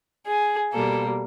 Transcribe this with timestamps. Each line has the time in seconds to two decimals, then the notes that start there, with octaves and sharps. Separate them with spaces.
0.26 G#4
0.73 B2 G3 A#3 A4